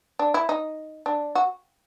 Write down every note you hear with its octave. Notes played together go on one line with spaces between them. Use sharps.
D4
E4
D#4
D4
F#4